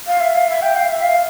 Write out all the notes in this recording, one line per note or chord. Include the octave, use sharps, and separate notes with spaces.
F5
E5
F5
E5
G5
F5
E5
F5